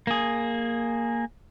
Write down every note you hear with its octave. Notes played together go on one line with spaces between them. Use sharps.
A#3 G#4